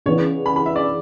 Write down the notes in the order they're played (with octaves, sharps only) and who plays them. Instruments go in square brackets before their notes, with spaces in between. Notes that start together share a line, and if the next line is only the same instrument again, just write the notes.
[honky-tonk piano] C#3 E3 B3 D4 [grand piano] C#5
[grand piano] B5
B5
E5
D5